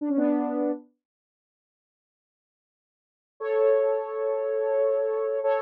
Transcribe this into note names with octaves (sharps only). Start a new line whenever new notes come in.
D4
C#4
B3 D4
A4 C#5
A4 C#5